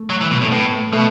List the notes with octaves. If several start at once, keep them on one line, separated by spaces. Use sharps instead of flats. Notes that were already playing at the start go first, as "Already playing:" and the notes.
Already playing: A3
F#3
E3
B2
A2 A3
A2 B3
A3
B2 A3